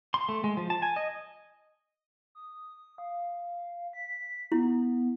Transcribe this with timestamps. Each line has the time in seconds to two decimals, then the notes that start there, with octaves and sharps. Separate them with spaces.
0.14 C6
0.29 A3
0.44 G#3
0.57 F3
0.70 A5
0.82 G#5
0.96 D#5
2.35 D#6
2.98 F5
3.93 B6
4.52 B3 E4